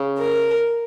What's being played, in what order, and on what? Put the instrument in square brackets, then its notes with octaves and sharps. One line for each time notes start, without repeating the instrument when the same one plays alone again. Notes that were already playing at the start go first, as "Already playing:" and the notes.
Already playing: [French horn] C#3
[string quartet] A#4